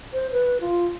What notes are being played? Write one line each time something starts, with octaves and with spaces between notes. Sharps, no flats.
C5
B4
F4